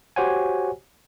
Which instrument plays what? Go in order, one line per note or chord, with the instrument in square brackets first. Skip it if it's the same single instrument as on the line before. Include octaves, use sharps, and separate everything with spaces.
[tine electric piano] F#4 G4 C5 C#5 F#5 G#5